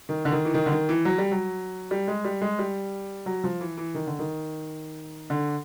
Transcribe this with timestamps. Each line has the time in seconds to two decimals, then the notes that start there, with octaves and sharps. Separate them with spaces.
0.09 D#3
0.25 D3
0.32 D#3
0.45 E3
0.54 D#3
0.66 D3
0.72 D#3
0.89 E3
1.05 F#3
1.18 G3
1.31 F#3
1.91 G3
2.08 G#3
2.24 G3
2.41 G#3
2.59 G3
3.26 F#3
3.44 F3
3.60 E3
3.77 E3
3.94 D#3
4.07 D3
4.19 D#3
5.30 D3